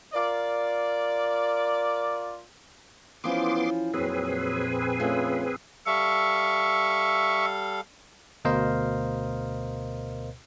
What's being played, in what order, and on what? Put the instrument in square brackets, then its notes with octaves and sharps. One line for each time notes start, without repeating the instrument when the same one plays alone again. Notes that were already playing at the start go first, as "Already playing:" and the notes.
[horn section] F4 A#4 D5
[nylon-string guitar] E3 F3 C#4 [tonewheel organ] B3 C6 D6
[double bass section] F2 A#2 [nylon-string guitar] F#3 [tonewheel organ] C4 G#4 B4
[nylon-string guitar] F3 A3 C#4
[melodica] G3 A4 F5 [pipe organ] E5 C#6
[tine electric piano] D2 B2 A#4 C5 D#5 F5